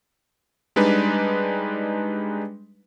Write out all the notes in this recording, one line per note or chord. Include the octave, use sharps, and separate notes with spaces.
G3 G#3 D4 D#4 B4